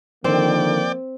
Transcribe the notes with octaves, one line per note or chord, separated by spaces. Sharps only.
D3 D#3 F3 A#3 C4 D5 G5